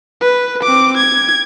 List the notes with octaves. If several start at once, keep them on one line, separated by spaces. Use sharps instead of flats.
B4
C4 D6
G#6